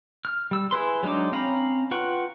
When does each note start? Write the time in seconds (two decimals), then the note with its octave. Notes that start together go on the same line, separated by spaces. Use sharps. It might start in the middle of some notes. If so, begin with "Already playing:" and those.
0.25 F6
0.51 G3 E6
0.71 E4 G#4 B4 C6
1.03 F#3 G#3 D4 D#4 D6
1.32 C4 C#4 F5 A#5 B5
1.91 F4 B4 F#5 G5 C#6